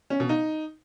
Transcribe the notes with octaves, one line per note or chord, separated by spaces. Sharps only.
C#4
B2
D#4